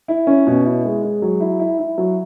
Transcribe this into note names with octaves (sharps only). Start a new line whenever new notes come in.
E4
C#4
B2
E4
G#3
G#3
F#3
E4
E4
E4
F#3